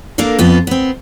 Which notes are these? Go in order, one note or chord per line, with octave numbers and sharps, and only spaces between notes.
A#3 D4 A4 A#4 F5
F2 B3 F4
B3 C4